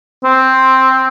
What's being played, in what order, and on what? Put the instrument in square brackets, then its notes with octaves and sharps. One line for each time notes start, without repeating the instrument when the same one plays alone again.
[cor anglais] C4